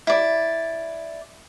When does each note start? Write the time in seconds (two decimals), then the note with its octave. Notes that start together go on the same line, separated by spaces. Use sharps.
0.07 E4 D5